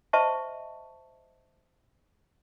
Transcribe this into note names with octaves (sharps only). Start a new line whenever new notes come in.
C5 D#5 E5 A5 C#6